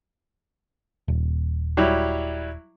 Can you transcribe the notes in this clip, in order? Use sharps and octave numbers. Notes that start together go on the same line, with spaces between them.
D#1
F#3 G3 E4